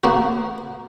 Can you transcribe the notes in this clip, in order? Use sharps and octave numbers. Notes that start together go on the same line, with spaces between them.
A#3 B3 F#4